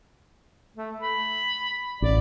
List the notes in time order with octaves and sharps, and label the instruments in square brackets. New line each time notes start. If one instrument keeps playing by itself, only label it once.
[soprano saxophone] A3
B5
[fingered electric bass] A1 [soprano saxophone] D5